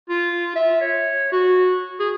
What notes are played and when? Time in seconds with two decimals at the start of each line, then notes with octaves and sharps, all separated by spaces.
0.09 F4
0.56 E5
0.81 C#5
1.32 F#4
2.00 G#4